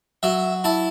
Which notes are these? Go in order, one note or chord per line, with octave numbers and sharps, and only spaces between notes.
F#3 E5
E4 A5